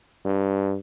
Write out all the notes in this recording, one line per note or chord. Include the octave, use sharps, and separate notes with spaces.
G2